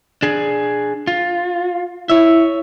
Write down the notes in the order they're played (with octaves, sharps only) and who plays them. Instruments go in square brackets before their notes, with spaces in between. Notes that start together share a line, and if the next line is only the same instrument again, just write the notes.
[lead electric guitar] D4 G#4
F4
[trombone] E4 [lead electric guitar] C#5 E5